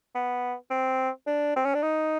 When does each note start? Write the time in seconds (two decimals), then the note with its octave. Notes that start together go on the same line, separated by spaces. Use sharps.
0.15 B3
0.70 C4
1.27 D4
1.56 C4
1.65 C#4
1.74 D4
1.83 D#4